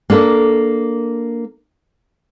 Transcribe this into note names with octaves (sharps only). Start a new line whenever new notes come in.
A#3 D4 A4 A#4